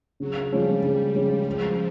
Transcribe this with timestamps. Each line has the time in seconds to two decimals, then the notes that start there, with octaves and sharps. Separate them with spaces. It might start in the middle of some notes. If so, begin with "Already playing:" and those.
0.20 C#3 F#3
0.52 F3 G3 G#3 C#4 F4
0.83 C#3 G3
1.15 F3 G#3 C#4 F4
1.46 F3 G#3